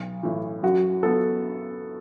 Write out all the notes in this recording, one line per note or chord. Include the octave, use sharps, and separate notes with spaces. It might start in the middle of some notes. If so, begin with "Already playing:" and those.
Already playing: B1
A2 E3
F#2 F#4
F#3 B3 A4